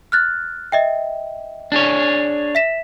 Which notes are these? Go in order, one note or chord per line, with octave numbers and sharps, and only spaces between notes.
F6 F#6 A6
D#5 E5 G5
D4 G#4 C#5
E5 B6 E7